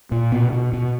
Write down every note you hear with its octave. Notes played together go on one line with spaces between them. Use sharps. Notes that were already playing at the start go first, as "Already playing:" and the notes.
A#2
B2
B2
B2